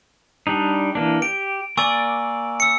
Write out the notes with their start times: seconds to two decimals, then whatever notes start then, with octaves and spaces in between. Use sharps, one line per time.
0.47 G3 D4 D#4
0.95 E3 A#3 D4
1.22 G4 D7
1.77 A#3 D5 G#5 C#6 E6
2.60 E6 C#7